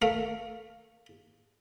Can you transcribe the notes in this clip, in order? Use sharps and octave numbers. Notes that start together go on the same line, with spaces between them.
A3 A#4 F5